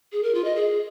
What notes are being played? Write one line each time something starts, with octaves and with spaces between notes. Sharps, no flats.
G#4
A#4
F4
D#5
G#4